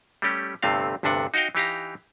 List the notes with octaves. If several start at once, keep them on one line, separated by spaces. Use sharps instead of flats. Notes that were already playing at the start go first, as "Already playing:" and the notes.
G3 A3 C#4 G4
G1 G2 C3 A3 C4 F5
G1 D2 G2 C3 D4 F#5
D#4 F#4 D#5 F5 G5
E3 D#4 G4 F5 A#5